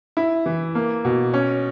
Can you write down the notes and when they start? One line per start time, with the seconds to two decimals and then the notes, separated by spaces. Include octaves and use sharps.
0.17 E4
0.46 E3
0.75 A#3
1.05 B2
1.34 C#4